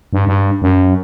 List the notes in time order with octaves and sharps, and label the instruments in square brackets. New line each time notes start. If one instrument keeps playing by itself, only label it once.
[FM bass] G2
G2
F#2